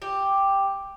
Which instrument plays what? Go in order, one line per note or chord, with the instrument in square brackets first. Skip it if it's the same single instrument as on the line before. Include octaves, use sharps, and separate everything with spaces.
[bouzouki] G4